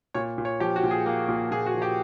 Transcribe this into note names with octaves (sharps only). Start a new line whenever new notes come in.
A#2 C#5
A#2
C#5
F3 G4
F#4
A#2
G#4
A#3
A#2
A#2 G#4
F#4
F3
G4